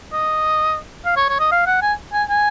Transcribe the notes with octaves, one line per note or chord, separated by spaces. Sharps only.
D#5
F5
C#5
C#5
D#5
F5
F#5
G#5
G#5
G#5